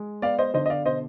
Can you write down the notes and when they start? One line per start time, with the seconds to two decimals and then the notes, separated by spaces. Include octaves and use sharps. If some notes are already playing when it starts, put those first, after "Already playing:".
Already playing: G#3
0.22 B3 D5 F5
0.39 C5 D#5
0.54 D3 C5 D#5
0.66 D#5
0.70 D5 F5
0.85 B2 C5 D#5